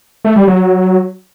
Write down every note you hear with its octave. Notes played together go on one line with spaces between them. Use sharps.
A3
G3
F#3